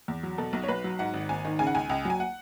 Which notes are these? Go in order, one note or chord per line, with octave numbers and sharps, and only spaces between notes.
E2
F#3
B2 A4
B1
C#5
B1 B4
F#3
G#2 F#5
G#1
G#1 G#5
D#3
C#3 G#5
F#5
C#2 G#5
C#2
F#3 G#5
F#5